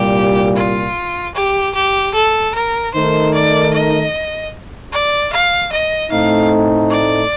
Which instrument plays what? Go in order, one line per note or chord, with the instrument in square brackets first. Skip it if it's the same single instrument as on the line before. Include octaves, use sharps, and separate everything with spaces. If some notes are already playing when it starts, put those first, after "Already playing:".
Already playing: [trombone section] C2 A#2 G3 [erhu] G4
[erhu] F4
G4
G4
A4
A#4
[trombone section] D#3 A3 D#4 A#4 [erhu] C5
[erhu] D5
D#5
D5
F5
D#5
[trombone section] A2 A3 C4 D#4 [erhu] F5
[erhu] D5